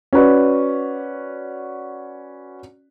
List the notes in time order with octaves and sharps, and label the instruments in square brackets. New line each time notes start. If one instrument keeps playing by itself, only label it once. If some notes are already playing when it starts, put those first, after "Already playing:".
[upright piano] C#4 F#4 B4 D5